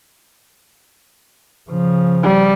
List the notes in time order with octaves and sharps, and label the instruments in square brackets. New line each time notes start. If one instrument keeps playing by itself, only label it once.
[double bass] C#3 F3
[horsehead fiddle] G3